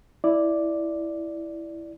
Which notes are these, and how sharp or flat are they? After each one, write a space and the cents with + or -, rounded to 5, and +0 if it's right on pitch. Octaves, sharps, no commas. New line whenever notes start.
E4 +0 D5 +0